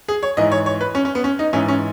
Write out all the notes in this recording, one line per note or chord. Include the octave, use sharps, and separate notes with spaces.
G#4
C#5
G#2 E3 D#5
C#5
C#5
B4
C#4
C#4
B3
C#4
D#4
G#2 E3 C#4
C#4